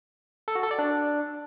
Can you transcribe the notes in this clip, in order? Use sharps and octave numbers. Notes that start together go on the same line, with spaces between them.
A4
F#4
A4
D5
D4